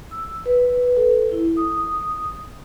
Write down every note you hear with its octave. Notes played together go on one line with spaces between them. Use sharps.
E6
B4
A4
E4
D#6